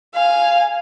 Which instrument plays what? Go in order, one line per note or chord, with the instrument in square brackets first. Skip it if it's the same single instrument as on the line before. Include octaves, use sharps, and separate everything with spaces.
[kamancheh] F5 G#5